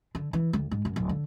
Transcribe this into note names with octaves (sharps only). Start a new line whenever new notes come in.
D3
E3
D2
G#2
F#2
D1
D3